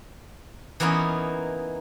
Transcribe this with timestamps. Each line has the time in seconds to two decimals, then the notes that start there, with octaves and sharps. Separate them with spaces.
0.80 E3 A#3 B3 C#4 D#4